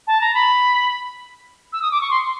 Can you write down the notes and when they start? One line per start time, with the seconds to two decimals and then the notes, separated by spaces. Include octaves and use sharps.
0.07 A5
0.21 A#5
0.34 B5
1.73 E6
1.82 D#6
1.91 D6
2.01 C#6
2.11 C6